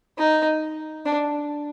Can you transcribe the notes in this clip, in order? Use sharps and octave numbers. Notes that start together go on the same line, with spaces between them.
D#4
D4